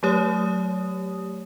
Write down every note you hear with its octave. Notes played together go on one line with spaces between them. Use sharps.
F#3 A3 G4 C#5 D#6